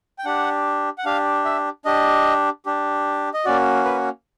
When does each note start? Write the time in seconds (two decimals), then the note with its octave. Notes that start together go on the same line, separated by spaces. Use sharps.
0.19 G5
0.25 D4 G4 F#5
0.98 F#5
1.05 D4 G4 F5
1.45 E5
1.85 D4 G4 D#5
2.66 D4 G4
3.34 D#5
3.45 A#3 C#4 F#4 D5
3.85 B4